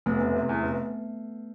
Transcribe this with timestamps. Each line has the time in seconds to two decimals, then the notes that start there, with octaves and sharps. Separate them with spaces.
0.06 F1 A3 B3
0.21 F1
0.35 C3
0.49 E2
0.63 F1